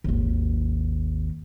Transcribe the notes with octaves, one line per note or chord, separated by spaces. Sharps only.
G#1 D#2